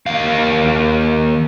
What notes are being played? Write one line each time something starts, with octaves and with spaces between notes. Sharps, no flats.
D#2 F5